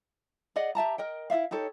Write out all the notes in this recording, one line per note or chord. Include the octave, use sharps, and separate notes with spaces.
G#4 D5 D#5 F#5
G4 E5 A5 A#5
A#4 D#5 G5
E4 D5 E5 F5
D#4 G4 A4 C#5